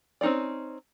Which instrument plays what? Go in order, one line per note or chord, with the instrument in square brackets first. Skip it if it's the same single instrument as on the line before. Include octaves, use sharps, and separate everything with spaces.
[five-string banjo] C4 C#4 D#4 F4 D5